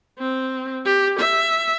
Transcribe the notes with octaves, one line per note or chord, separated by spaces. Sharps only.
C4
G4
E5